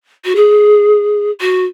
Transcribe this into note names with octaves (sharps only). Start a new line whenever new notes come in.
F#4
G#4
F#4